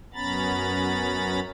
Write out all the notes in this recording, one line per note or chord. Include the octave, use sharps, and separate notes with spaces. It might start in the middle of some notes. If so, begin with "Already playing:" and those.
F#2 B3 C#4 A#5 B5 A6